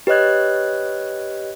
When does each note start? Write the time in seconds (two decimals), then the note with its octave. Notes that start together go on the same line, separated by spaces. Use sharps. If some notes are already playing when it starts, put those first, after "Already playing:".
0.07 G4 B4 C#5 D#5 F#6 G#6